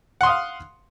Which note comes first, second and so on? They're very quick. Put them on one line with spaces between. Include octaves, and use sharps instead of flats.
F#5 C6 D#6 F5